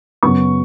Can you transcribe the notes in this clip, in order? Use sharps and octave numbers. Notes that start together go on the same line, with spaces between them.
F#2 C#3 F#3 B3 C#6